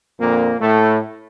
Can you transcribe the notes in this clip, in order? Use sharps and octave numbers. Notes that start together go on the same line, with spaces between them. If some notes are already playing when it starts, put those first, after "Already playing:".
F2 A#2 D3 A#3
A2 A3